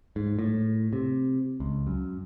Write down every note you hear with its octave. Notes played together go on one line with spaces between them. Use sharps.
G#2
A2
C3
C#2
F#2